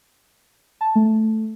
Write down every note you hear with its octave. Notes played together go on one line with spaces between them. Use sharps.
A5
A3